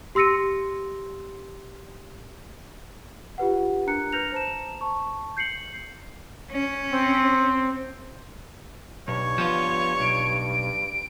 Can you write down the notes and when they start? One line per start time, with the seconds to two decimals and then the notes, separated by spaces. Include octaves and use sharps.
0.15 G4 C6 E6 A#6 C#7 D#7
3.38 F4 G4 B4 F#5
3.87 D4 A#4 A#5 F#6 C#7
4.12 B4 F6 G6 A#6 C#7 F7
4.32 C5 A5 A#5 E7
4.81 A5 C#6
5.37 G6 C7 C#7 F#7
6.51 C#4
6.92 C4
9.08 B1 G2 C#5
9.38 F3 B3 F4
10.00 B1 D7